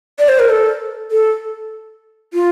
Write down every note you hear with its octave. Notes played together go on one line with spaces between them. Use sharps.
D5
C5
A#4
A4
A4
F4